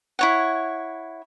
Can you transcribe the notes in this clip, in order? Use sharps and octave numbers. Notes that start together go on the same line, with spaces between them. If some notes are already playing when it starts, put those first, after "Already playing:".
E4 C#5 F#5